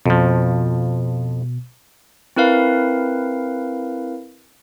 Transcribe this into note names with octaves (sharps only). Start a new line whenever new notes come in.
F2 B2 F3
C4 E4 A#4 B4 F5